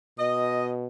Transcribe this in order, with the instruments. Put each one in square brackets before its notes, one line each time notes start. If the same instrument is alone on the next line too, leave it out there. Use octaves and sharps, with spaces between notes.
[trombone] B2 [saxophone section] D#5